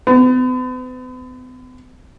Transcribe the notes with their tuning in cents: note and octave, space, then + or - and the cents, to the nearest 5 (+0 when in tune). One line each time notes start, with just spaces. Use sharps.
B3 +45